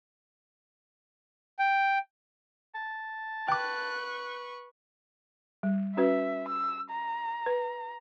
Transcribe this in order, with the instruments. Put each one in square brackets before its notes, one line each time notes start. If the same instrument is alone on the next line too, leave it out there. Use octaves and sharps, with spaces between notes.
[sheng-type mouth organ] G5
[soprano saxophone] A5
[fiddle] B4 C#6 [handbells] G5 D6 [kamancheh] F#6
[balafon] G3
[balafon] C#4 F#4 B4 [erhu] E5
[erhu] E6
A#5
[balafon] B4